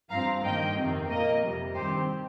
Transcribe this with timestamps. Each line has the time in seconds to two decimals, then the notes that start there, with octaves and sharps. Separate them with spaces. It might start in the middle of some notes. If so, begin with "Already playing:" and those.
0.10 G2 F3 C4 F5 A#5
0.43 G2 D#3 A#3 D#5 G5
0.76 F2 C3 D#3 C4
1.09 A#2 A#3 A#4 D#5
1.42 F2 C3 G3
1.75 G2 D#3 C4 G4 C5